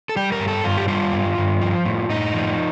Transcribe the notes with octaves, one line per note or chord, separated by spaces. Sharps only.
A4
G3 G4
A#4
G2
A4
G2 F4
G4
G3 F4
G2
G2
F3
A2
A2 D#4
F3